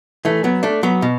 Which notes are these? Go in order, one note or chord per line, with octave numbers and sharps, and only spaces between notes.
E3 A3
F#3 B3
A3 D4
F#3 B3
B2